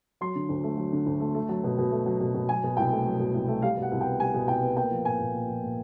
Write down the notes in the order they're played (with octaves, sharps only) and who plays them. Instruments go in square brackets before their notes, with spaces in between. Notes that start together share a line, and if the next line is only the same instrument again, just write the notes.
[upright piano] F#3 C6
D3
D2
A3
F#3
D3
D2
A3
A3
F#3
B2
B2
A3
F#3
B2
B2
F#3 G#5
B2
C2 G5
A3
F#3
B2
C2
A3
G3 F5
B2
F#5
C2
G5
B3
G3 G#5
B2
C2 G5
B3
A#3 G5
F3
A#2 G#5
A#2
A#3
F3
A#2